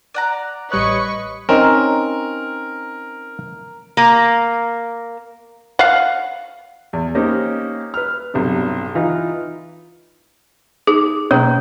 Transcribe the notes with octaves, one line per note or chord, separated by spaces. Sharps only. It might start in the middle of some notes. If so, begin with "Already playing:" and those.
D5 F#5 A#5
A1 G3 B4 C#5 D#5 C#6 F#6
C4 C#4 D#4 A#4
A#3
F5 F#5
E2
A#3 C#4 D#4 G4 C5 D#5
B4 F6
B1 G2 C3
E3 D#4 F4 B4
D#4 G#4
B2 A#3 C#4 C#5